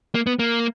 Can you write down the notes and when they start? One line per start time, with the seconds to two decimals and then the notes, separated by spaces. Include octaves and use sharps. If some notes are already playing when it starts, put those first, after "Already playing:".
0.15 A#3
0.27 B3
0.39 A#3